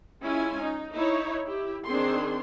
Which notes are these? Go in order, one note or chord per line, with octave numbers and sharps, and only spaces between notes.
G#3 C#4 E4 F4 G#5
D#4
D#4 E4 C#5
E4 G4
D#3 C4 D4 G#4 C6